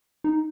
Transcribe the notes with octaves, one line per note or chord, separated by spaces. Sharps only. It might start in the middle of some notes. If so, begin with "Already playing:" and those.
D#4